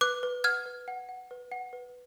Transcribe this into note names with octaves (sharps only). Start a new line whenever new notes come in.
B4 D6 F#6
B4
F#5 F6 G#6
B4
F#5
F#5
B4
F#5
B4